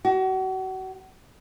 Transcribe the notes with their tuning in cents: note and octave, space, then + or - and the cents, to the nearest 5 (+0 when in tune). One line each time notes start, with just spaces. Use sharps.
F#4 +35